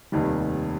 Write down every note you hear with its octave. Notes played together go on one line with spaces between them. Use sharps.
F1 D#2 D#3 G3